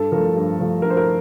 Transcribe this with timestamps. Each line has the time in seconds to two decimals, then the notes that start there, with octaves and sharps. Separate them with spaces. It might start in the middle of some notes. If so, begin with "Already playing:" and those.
Already playing: G2 A4
0.12 F3 A3 A#4
0.36 G2
0.60 F3 A3
0.82 G2 A#4
0.90 C5
0.97 A#4